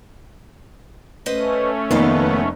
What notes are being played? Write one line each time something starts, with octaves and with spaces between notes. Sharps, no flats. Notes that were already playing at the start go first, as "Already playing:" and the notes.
A3 C#4 B4 C5 D#5
F1 F#2 D#3 A#3 B3 D#4 A4 F5